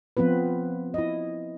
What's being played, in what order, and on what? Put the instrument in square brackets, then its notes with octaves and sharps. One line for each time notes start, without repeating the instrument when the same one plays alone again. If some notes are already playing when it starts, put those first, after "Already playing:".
[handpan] F3 B3 C4 F4 B4
E4 D#5